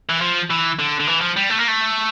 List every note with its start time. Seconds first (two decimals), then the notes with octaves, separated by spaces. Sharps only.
0.09 E3
0.21 F3
0.50 E3
0.79 D3
0.99 D3
1.07 E3
1.21 F3
1.36 G3
1.49 A3
1.59 A#3
1.68 A3